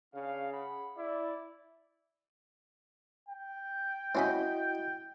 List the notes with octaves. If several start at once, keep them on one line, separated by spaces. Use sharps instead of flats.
C#3 D4 F5
G#4 F#5 B5
E4 D5
G5
C4 C#4 E4 F#4 D#5 B5